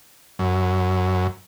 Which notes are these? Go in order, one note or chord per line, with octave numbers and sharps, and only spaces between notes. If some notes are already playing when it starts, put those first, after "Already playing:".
F#2